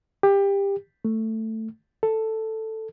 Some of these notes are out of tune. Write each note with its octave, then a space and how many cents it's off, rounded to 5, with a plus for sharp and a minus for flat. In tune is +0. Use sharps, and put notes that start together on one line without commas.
G4 +20
A3 +10
A4 +5